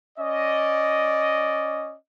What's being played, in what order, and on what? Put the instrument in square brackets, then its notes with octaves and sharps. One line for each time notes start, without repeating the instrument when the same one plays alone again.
[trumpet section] C#4 D5 D#5